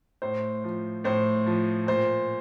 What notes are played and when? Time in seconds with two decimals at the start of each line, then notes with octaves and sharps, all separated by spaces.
0.22 A2 C5
0.64 F3
1.04 A2 C5
1.46 F3
1.87 A#2 C5